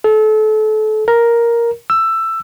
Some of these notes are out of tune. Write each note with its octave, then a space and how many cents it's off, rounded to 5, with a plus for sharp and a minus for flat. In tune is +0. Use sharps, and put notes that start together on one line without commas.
A4 -30
A#4 +5
E6 +15